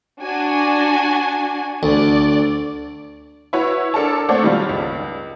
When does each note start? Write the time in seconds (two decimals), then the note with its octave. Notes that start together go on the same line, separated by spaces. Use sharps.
0.23 D4 F#4 G#5
1.83 D2 D5
3.53 E4 F#4 B4 C#5
3.94 D4 A4 A#4 A5
4.29 A3 C4 A4 C#5 D5 F#5
4.42 D#3 F#3 G3 F4
4.69 C#2